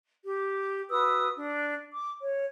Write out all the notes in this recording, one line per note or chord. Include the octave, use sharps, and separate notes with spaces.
G4
F#4 B4 D#6 E6
D4
D6
C#5